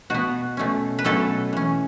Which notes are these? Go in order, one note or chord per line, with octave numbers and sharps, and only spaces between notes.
B2 B3 F#4
B2 A3 C#4
B4
B2 F#3 A3 C#4 A4
E3 C#4